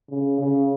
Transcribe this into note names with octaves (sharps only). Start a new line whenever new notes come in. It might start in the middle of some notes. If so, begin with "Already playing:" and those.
C#3
C#3